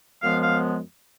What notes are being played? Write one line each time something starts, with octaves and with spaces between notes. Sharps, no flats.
F#2 F3 G#3 B3 F5
F5